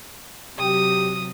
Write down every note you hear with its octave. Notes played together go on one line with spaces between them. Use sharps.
C3 F#3 G4 D#6